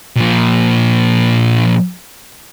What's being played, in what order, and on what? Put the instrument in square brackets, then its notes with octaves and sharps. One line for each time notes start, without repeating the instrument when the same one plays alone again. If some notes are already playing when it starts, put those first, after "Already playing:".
[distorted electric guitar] A#2 F3